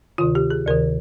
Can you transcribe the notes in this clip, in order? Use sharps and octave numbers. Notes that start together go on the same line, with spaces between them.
D2 C3 D#3 F4
G4
G#4
D2 C3 D#3 A#4